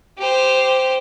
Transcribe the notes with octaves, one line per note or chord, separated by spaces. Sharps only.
G4 C5